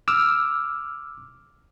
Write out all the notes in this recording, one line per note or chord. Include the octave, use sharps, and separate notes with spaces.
D6 E6 F6